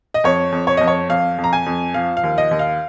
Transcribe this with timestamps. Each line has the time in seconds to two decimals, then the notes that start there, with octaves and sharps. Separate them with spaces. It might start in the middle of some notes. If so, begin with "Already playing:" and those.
0.14 D#5
0.24 F2 C#5
0.52 F2
0.67 C#5
0.77 F2 D#5
0.87 C#5
1.09 F2 F5
1.38 F2
1.44 A#5
1.53 G#5
1.66 F2
1.94 F3 F5
2.17 F5
2.24 D#2
2.38 D#5
2.51 D#2
2.59 F5